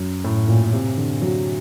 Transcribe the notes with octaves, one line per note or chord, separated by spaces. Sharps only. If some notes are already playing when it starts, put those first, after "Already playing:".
Already playing: F#2
A2
A#2
C3
D3
F#3